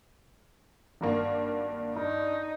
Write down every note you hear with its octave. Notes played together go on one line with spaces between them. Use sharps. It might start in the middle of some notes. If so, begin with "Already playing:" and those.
G#1 G2 A#3
G2 D#4